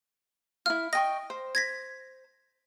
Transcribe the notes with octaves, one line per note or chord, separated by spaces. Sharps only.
E4 F4 F6
D#5 G5 C#6 A#6
C5
G#6 A#6 B6